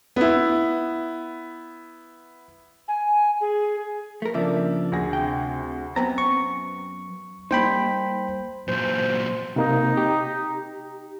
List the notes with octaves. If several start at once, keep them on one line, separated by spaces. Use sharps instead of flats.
B3 E4
G#5
G#4
A3 A#4
C#3 F3 A#3 D4 E5
D2 G#4 A#6
C3 G5
F#2 B3 C4 A#5
C#6
G3 A#3 D#4 C5 G5 B5
A#2 F#3 C5
C3 A#3 D#4
G4